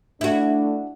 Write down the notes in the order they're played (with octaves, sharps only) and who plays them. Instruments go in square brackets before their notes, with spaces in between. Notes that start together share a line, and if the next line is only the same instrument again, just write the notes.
[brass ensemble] A3 D4 [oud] E4 F#4